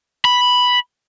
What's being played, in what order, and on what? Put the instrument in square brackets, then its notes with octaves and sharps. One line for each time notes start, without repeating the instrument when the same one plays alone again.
[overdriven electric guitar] B5